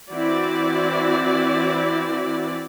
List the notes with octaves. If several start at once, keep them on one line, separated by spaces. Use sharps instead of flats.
E3 C4 E4 F#4 D5